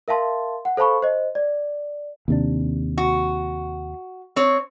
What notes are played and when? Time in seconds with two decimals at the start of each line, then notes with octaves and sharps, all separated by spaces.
0.08 A#4 E5 F5 A5 C6
0.65 F#5
0.77 A4 C5 F5 A5 B5 C#6
1.03 C5 D#5
1.35 D5
2.28 D#2 C3 D4
2.98 F#4
4.36 C4 C#5